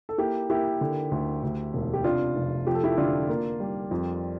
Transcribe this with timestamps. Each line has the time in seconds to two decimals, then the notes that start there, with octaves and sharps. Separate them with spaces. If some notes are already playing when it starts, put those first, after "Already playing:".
0.09 A4
0.18 A#3 E4 G4
0.50 A#3 E4 G4
0.81 D3
1.11 D2
1.43 D2
1.73 E1
1.94 G4
2.04 C3 D4 F4
2.36 F1
2.67 F3 G4
2.75 A4
2.83 E4 G4
2.98 D3 D4 F4
3.29 A#3
3.60 G3
3.91 F2